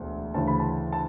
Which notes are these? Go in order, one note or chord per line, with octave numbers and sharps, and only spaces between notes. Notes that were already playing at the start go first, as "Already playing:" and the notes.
Already playing: E1 D2
D2 C#3 E3 A5
B5
A5
A5